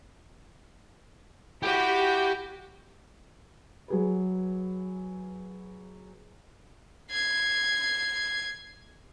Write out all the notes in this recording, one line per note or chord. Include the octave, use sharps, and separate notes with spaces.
E4 F#4 G4 G5
F#3 G#4 B4
G#6 C7